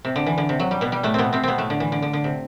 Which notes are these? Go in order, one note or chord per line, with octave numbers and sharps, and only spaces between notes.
C3
D3
E3
D3
C3
F#3
G3
B2 B3
G3
A2 A3
B2 B3 C4
C3 C4
B2 B3 C4
A2 A3
D3
E3
D3
D3
D3
C3